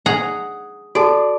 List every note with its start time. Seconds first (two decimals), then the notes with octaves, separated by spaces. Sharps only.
0.06 G#4 F#5 A#5
0.95 F#4 A4 D5 A5